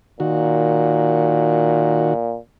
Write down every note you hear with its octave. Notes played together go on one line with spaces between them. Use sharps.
A#2 D#3 F#4